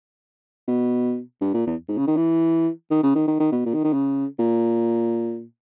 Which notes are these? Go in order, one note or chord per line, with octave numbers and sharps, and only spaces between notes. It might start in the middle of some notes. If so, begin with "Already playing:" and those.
B2
G2
A#2
E2
G#2
C#3
D#3
E3
D#3
C#3
D#3
D#3
D#3
B2
A#2
D#3
D#3
C#3
A#2